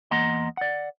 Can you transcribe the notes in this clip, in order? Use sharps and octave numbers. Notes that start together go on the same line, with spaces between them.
E2 A#3 D#5 F#5 A#5 C6
D5 F#5